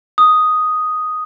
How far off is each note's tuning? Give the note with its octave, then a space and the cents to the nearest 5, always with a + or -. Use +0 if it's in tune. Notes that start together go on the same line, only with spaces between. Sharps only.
D#6 +0